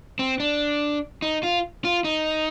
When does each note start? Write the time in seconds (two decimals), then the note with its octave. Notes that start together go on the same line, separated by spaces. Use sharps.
0.19 C4
0.40 D4
1.22 D#4
1.43 F4
1.84 F4
2.04 D#4